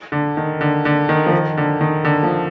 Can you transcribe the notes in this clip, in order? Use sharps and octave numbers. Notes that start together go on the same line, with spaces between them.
D3
D#3
D3
D3
D#3
F3
D#3
D3
D#3
D3
F3